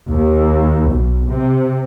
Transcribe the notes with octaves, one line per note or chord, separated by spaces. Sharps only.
D#2
B1
C3